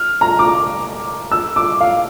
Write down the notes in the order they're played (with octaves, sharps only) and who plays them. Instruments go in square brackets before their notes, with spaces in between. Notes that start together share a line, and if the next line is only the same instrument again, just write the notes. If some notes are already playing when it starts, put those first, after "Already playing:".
Already playing: [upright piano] F6
A#5
D6
E6
D6
F5